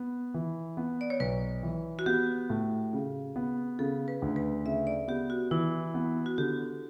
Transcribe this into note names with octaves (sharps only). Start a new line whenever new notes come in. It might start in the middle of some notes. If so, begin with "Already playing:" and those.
Already playing: B3
E3
B3
D5
C#5
B1 B4
E3
F#4
B3 G4
A2
C#3
B3
C#3 A4
B4
D2
B4
C#3 E5
D5
B3 G4
F#4
E3 E4
B3
F#4
D3 G4